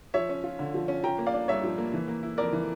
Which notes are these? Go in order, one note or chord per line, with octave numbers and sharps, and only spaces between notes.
F3 C#5 E5
C#4
F4
D3
F3
C#4
F3 G5 A#5
A#3
D5 F5
D4
G2 C#5 E5
F3
A#3
E3
A#3
E4
F2 A#4 D5
E3